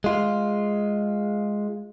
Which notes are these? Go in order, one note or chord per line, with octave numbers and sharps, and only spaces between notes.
G#3 F4